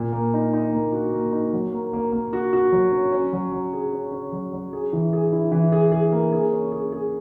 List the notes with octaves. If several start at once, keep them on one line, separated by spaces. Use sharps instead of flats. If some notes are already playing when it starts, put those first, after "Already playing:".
Already playing: A#2
A#3
D#4
D#4
A#3
F#4
A#3
D#4
F#3
A#3
A#3
A#3
F#4
F#4
F#3
C#4
C#4
F#3
F#3
G#4
C#4
C#4
F#3
F#3
G#4
E3
G#4
E4
E3
G#4
G#4
A#3
G#4
C#4
G#4
G#4